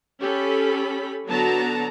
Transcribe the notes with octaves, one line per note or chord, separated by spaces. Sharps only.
C#4 G4 A4 B5
D3 F#3 B3 F#4 A5 A#5